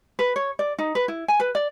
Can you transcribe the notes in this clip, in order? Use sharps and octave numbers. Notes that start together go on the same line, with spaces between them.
B4
C#5
D5
D#4
B4
E4
G#5
B4
D5